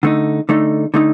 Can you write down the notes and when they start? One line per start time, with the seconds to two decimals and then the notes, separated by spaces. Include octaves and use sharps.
0.03 D3 A3 D#4
0.49 D3 A3 D#4
0.94 D3 A3 D#4